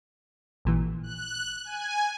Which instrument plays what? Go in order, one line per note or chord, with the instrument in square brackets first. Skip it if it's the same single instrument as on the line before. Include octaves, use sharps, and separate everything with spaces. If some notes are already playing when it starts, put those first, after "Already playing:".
[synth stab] A1 A#2 E3
[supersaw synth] F#6
G#5